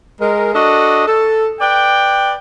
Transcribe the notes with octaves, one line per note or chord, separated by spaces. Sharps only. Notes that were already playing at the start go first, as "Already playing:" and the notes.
G#3 A#4
D4 F#4 A4 D#5
A4
B4 D5 G5